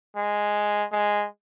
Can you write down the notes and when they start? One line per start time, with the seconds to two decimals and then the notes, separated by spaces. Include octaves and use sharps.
0.16 G#3
0.92 G#3